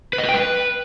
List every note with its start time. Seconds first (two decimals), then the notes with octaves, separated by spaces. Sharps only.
0.13 B4
0.18 D#5
0.24 B4
0.29 G5
0.34 B4